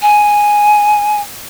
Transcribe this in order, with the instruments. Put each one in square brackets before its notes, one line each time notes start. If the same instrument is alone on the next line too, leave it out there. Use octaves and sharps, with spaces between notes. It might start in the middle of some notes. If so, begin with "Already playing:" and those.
[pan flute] G#5